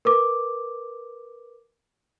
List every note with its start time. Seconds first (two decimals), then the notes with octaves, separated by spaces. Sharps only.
0.05 A#4 B4 D6